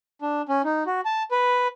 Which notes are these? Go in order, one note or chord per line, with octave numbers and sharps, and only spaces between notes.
D4
C#4
D#4
F#4
A5
B4